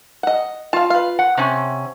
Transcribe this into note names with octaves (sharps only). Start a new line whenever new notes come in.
D#5 F#5
F4 F5 A5
B4 F5
F#5
C3 C#4